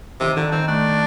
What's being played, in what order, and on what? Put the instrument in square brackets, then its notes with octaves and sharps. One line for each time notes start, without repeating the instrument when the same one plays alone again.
[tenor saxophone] C3 [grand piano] D#3
[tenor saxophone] D3 [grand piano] D#3
[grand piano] D#3 [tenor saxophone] C4
[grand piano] A3 [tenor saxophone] D4